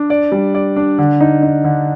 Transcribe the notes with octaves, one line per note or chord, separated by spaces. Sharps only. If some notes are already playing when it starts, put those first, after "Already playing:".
Already playing: D4
D5
G3
D5
D4
D3
D#4
D#4
D3